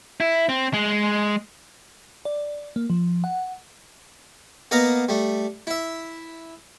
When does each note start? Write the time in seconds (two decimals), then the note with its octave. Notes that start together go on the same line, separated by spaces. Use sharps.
0.20 E4
0.49 C4
0.73 G#3
2.25 D5
2.76 A#3
2.90 F3
3.24 F#5
4.71 A#3 B3 D#5 F5 A#5
5.09 G3 A3
5.67 E4 E5